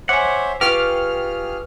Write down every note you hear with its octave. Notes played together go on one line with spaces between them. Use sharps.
C5 C#5 E5 F#5 G#5 D6
F4 G4 G#4 B4 G5 C#6 F6